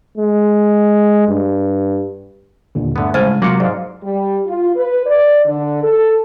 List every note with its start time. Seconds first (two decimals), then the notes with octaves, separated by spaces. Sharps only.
0.18 G#3
1.28 G2
2.75 D#2 A#2 D3
2.96 G2 D3 A3 B3
3.14 A2 C#3 G3 G#3 C5 G#5
3.42 C3 F#3 A#3 F4 D6 C#7
3.60 G#2 D5 F5
4.04 G3
4.47 F4
4.76 B4
5.06 D5
5.45 D3
5.83 A4